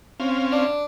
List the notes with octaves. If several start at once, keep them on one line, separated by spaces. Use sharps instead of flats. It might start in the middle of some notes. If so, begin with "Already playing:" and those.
C4 C#4 F5
D4